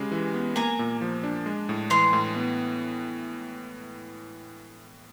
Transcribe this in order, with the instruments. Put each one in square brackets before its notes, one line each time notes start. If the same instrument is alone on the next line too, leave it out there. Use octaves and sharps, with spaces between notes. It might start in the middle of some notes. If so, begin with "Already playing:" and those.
Already playing: [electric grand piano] C#3 G#3 G4
E3
B3
[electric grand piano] A#3 [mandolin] G#5 A#5
[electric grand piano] A#2
F3
D4
G#3
A2
[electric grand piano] E3 [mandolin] A#5 C6
[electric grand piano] A2
B3